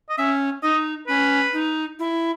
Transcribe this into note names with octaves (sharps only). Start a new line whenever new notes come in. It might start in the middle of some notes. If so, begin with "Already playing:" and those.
D#5
C#4 E5
D#4 D#5
C#4 B4
D#4
E4